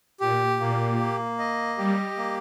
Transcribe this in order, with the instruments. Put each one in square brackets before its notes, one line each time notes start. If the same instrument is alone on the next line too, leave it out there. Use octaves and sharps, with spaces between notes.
[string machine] A#2 [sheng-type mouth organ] G4
[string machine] A#2 [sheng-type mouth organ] A#3
[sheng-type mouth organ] A#3
D#5
[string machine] G3 [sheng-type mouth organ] G4
[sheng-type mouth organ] A#3